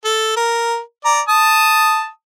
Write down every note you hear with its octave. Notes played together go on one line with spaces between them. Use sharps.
A4
A#4
D5 A#5
A5 D#6